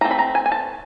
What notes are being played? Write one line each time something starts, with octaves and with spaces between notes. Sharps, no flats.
E3 A3 C4 A#5
B5
A#5
G#5
G#5
A5